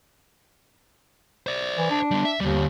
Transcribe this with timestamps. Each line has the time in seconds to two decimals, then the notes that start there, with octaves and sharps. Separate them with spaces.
1.47 C5 D5
1.78 E3
1.91 D4
2.11 G3 B3
2.25 E5
2.40 D#2 D3 G3